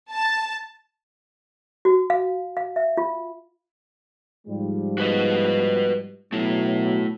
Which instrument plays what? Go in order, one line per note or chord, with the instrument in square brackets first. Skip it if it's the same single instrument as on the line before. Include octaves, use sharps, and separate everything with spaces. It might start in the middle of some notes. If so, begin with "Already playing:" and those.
[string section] A5
[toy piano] F#4
F5
F5
E5
F4
[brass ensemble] G#2 F3 G3
[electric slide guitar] F#4 B4 D#5
[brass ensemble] B2 F#3 [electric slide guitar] A3 E4